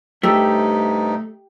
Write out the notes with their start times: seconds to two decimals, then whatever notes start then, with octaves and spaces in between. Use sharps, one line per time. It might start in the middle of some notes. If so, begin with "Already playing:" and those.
0.23 G2 C3 A3 D#4 G4